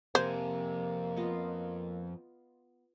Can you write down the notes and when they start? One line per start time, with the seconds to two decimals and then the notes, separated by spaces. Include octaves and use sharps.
0.15 F2 C3 A#3 C5 G#5
1.17 B3 F4 D#5